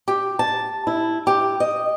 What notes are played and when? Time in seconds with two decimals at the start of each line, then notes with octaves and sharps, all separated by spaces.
0.08 G4
0.39 A5
0.87 E4
1.27 G4
1.60 D#5